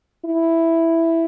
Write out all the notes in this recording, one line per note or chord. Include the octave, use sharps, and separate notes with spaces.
E4